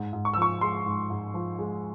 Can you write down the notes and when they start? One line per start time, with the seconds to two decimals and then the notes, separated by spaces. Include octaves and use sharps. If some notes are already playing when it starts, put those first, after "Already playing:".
Already playing: G#2
0.13 G#2
0.25 C#6
0.33 E6
0.37 F3 C#6
0.61 G#3 C6
0.86 G#2
1.10 G#2
1.34 F3
1.59 G#3